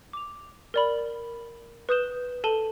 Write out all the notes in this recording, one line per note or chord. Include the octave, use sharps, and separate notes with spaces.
D6 F7
A#4 D5 B5
B4 D#6 G6 E7 G7
A4 A5 D#7 G7